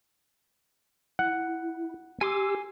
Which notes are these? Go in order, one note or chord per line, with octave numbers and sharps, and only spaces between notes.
E4 F#5
G4 G#5 C6 D6 E6